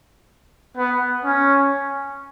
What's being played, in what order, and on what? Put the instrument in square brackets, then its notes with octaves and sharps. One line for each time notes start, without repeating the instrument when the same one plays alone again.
[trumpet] B3
C#4